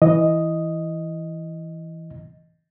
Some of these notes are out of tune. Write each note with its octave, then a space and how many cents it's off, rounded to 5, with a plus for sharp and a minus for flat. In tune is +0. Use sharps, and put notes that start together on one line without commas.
E3 +0 D#5 +0